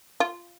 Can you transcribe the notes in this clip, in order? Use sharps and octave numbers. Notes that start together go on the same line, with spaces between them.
F4